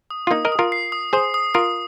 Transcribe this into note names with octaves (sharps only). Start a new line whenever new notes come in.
D#6
F4
A#3 D#4 D#6
A#4 D#5
D#6
F4 A#4
C7
D#6
G#4 C5 D#6
D#6
F4 A#4 D#6